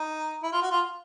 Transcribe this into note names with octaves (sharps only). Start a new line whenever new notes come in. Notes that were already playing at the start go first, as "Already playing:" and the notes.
Already playing: D#4
E4
F4
F#4
F4